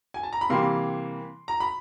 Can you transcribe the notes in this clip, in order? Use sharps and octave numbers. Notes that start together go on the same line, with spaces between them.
G#5
A5
A#5
B5
C3 E3 G3 A#3 C6
A#5
B5